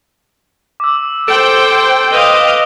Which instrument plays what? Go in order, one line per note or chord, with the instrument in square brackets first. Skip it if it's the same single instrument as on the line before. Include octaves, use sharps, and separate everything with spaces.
[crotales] D6 E6
[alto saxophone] A4 [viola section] C5 G5 [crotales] D7 F#7
[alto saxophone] B4 [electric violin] D#5 F5 [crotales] D#6 E7 G7